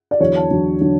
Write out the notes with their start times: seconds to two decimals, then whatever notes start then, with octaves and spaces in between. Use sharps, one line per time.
0.11 D5
0.20 E2 D3 F#3 C#5
0.36 A5
0.51 E2 D3 F#3
0.81 D3 F#3